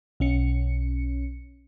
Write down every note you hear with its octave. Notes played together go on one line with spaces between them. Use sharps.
B1 C#4 C#7